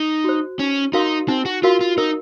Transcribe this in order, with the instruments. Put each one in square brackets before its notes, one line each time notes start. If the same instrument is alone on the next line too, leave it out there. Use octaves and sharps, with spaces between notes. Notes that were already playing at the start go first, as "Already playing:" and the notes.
Already playing: [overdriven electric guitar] D#4
[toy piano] F#4 C5
[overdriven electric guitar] C#4 [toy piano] D#4
[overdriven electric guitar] D#4 [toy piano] F#4 A#4 F5 C6
[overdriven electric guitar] C4 [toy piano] D#4
[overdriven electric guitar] F#4
[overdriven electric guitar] F4 [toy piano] F#4 A#4 F5 C6
[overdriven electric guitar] F4
[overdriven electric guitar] D#4 [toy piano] A#4